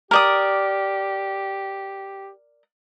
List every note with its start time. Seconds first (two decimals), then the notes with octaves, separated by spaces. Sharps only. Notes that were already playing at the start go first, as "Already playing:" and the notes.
0.11 G4 A#4 D5 D#6